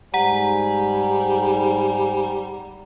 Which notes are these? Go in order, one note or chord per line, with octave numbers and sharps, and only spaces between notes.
G#2 G3 C5 F#5 G#5 A#5